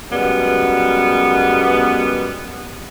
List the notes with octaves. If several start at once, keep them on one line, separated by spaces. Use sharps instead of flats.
F#2 G3 G#3 B3